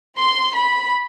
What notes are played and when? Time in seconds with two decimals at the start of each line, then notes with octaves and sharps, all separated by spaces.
0.17 C6
0.57 B5